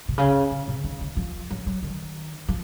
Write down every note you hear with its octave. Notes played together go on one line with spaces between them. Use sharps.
C3
C#3
C#3
C3
D#3
D#3
F3
F#3
F#3
D#3
F3